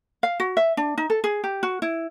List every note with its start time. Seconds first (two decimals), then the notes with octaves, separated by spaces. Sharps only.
0.23 F5
0.40 F#4
0.57 E5
0.77 D4
0.97 D#4
1.10 A4
1.24 G#4
1.44 G4
1.63 F#4
1.82 E4